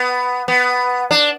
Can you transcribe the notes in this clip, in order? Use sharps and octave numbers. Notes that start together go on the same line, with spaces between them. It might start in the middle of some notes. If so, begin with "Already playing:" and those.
Already playing: B3
B3
D4